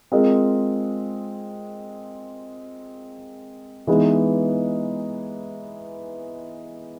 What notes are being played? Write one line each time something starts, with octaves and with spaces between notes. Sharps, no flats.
G#3 C4 F4 A#4 D#5
E3 G#3 B3 D#4